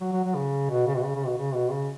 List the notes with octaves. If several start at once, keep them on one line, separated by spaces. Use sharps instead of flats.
F#3
F#3
F#3
C#3
B2
C#3
B2
C#3
C#3
B2
C#3
B2
C#3